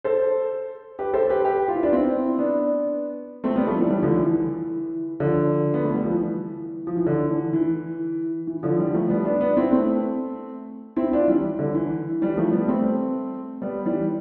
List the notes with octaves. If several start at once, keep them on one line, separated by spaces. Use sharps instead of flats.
A4 C5
G4 B4
A4 C5
G4 B4
G4 B4
F4
E4
D4 F4
C4 E4
B3 D4
A3 C4
G3 B3
F3 A3
E3 G3
E3 G3
D3 F3
E3
E3
D3 F3
B3
A3
G3
F3
E3
F3
E3
D3
E3
E3
E3
D3 F3
E3 G3
F3 A3
G3 B3
B3 D4
B3 D4
C4 E4
A3 C4
C4 E4
D4 F4
E3 G3
D3
E3
E3 G3
F3 A3
G3 B3
A3 C4
G3 B3
E3 G3